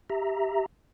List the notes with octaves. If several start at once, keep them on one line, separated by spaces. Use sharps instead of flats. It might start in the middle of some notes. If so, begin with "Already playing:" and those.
G4 E5 A#5